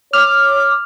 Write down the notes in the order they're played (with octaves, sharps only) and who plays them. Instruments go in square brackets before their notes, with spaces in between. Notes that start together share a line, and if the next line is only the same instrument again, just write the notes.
[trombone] C#5 [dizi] D6 [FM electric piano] F6